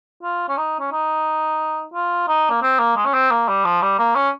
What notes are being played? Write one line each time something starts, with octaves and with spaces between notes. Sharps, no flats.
F4
C#4
D#4
C#4
D#4
F4
D#4
A#3
C4
A#3
G#3
C#4
C4
A#3
G3
F3
G3
A#3
C#4